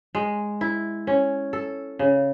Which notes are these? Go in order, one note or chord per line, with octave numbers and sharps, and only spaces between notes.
G#3
E4
C#4
A4
C#3